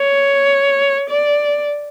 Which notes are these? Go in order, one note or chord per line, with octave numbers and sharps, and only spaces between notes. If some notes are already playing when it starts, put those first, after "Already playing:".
Already playing: C#5
D5